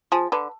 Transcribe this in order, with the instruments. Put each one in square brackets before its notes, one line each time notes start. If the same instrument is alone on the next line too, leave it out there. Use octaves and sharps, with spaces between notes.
[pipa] F3 [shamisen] G#4
[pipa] D3 [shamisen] B4